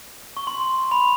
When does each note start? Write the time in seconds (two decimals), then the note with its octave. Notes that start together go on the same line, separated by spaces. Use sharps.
0.37 C#6
0.47 C6
0.91 B5